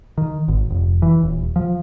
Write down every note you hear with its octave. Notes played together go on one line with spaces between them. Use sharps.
D#3
G#1
F1
E3
D#1
F3